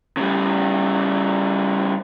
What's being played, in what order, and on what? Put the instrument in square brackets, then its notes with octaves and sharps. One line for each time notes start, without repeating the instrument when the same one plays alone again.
[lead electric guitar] C#3 G3